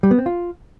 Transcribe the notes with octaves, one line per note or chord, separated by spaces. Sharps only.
G3
B3
C4
F4